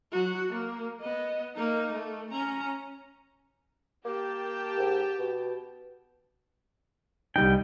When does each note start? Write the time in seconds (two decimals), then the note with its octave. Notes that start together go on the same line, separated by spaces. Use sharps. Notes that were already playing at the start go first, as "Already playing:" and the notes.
0.12 F#3 F#4
0.50 A#3
1.01 B3 D#5
1.55 A#3 D#4
1.93 A3
2.31 C#4 A#5
4.05 A#3 G4 G5 A5
4.79 G#2
5.19 B2
7.36 C2 G3 D#4 G5